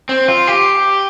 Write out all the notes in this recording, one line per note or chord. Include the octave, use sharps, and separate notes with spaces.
C4
F4
G4